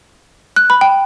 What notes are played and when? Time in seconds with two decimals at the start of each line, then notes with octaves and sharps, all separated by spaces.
0.56 F#6
0.70 B5
0.81 G5